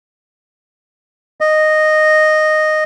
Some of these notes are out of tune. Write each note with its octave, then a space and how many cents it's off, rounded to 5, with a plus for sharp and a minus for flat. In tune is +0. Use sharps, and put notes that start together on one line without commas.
D#5 -10